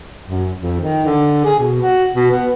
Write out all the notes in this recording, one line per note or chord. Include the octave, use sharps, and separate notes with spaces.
F#2
F2
D#3
D3
G#4
B2
F#4
B2
B3